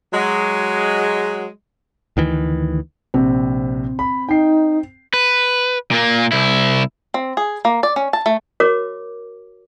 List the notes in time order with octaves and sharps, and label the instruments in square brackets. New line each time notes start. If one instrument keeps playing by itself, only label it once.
[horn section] F#3 G#3
[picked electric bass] D2 D#3 E3
[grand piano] A#1 C3 [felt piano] C4
[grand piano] B5
[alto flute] D#4 [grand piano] G5 C7
[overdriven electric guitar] B4
A#2 A#3
C2 E4
[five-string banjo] C4
G#4
A#3
D5
C#4
A5
A3
[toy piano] F#4 A#4 C#5 D6